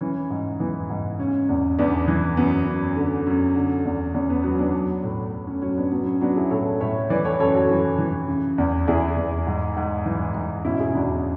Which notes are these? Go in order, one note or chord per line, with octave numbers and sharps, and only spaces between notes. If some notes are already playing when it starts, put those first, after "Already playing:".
E3 C#4
G#2
E3 B3
G#2
C#3 C#4
E2
E2 B3 D4
E3
F#2 B3
F#2
D3
F#2
D3
E2
E2 C#4
B3
F#3 B3
B3 D4
F#3
A2
A2
C#4
F#3 C#4
B3 D4
F#3 B3
C#4
F#3 B3 D4
E4 G#4
A2 A4 C#5
A2 C#5 E5
E3 B4 D5
A4 C#5
F#2 A4 C#5
F#4 A4
E3
E3
C#3
E2
E2 E4 G#4
E2
G#2
G#2
E3
G#2
B2 C#4 E4
E4 G#4
E2 D4 F#4
C#4